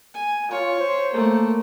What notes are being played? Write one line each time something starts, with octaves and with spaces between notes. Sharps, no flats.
G#5
F4 C#5
C5
A3 A#3